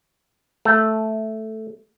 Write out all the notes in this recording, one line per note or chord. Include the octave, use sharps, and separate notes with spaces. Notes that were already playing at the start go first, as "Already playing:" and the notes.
A3